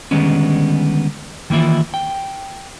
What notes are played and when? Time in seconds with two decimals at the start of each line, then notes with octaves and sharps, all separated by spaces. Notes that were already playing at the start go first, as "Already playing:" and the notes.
0.11 D3 D#3 G3 G#3 B3 C#4
1.50 D#3 E3 A#3 E4 F4
1.94 G5